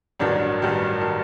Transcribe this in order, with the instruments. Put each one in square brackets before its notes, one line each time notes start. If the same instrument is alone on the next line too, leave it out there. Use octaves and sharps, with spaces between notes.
[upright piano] A1 G2 D#3 F#3 D4
A1 G2 D#3 F#3
D#3 F#3